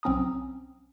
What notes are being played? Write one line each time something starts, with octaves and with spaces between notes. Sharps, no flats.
B1 C4 C#4 A#5 D#6